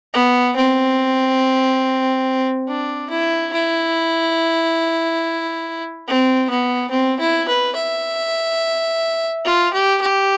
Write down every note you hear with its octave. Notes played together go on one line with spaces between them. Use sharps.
B3
C4
D4
E4
E4
C4
B3
C4
E4
B4
E5
F4
G4
G4